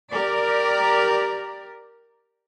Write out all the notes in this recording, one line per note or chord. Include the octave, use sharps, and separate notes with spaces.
G4 A#4 D5